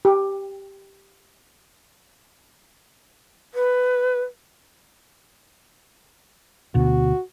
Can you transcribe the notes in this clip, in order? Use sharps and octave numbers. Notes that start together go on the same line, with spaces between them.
G4
B4
D2 B2 F#4